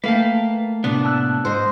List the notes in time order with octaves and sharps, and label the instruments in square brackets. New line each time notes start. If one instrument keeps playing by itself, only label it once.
[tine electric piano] A3 [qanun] A#3 G5 [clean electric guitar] B4 F5 A5
[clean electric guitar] A2 C3 B3 [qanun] D4
[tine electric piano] A5 E6 F#6
[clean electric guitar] G#2 [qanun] C5 D#5